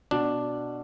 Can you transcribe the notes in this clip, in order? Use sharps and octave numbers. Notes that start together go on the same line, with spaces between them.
B2 D4